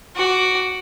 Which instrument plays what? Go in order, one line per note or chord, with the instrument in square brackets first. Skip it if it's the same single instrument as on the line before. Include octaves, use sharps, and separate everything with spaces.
[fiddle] F#4 D6